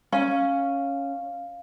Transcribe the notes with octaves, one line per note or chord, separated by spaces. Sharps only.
C#4 F5